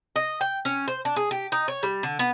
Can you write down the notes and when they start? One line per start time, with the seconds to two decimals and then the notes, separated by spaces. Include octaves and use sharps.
0.16 D#5
0.41 G5
0.65 C#4
0.88 C5
1.05 D4
1.16 G#4
1.31 G4
1.52 D#4
1.68 C#5
1.83 G3
2.03 D3
2.19 B3